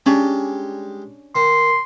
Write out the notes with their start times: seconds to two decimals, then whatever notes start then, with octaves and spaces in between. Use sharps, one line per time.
0.06 G3 G#3 C#4 D4
1.35 D#3 C6